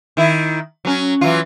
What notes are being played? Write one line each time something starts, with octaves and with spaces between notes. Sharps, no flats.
D#3 E4
F#3 C#4
E3 F#3 F4